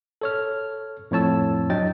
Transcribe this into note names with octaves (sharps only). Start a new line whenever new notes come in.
A4 C#5 F6
F2 A2 C#5 A5 E6
F#3 D4 D#5 G5 A6